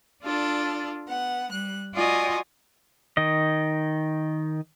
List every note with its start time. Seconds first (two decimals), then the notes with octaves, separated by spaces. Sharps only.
0.23 D4 F4 A4 D5
1.09 B3 F#5
1.52 G3 F#6
1.95 F4 F#4 D5 D#5 G#5 C6
3.17 D#3 D#5